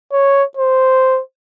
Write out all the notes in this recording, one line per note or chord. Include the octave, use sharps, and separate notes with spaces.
C#5
C5